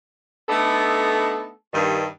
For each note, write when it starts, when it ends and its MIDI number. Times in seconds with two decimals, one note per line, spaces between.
0.49 1.51 57
0.49 1.51 59
0.49 1.51 62
0.49 1.51 63
0.49 1.51 69
1.73 2.05 43
1.73 2.05 51